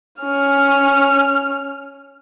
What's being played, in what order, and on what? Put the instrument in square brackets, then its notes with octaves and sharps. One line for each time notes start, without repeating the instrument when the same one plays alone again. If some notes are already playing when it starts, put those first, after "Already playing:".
[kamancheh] C#4 F6